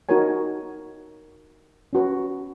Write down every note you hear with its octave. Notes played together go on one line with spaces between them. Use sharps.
D#4 F#4 A#4 C#5 G#5
C#4 F#4 B4